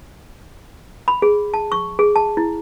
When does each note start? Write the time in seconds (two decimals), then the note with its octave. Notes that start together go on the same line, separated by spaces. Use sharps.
1.08 B5
1.22 G#4
1.54 A5
1.72 C#6
1.99 G#4
2.16 A5
2.37 E4